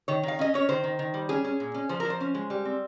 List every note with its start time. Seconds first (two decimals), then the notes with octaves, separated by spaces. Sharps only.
0.08 D#3 C#5
0.23 D#3 F5
0.39 C#4 D#5
0.54 C#4 C#5
0.69 D#3 C5
0.84 D#3
0.99 D#3
1.14 G3
1.29 C#4 G#4
1.44 C#4
1.60 A#2
1.74 C#4
1.89 F3 C5
2.00 F3 A#4
2.10 C5
2.21 C#4
2.35 G#3
2.50 G3
2.65 C4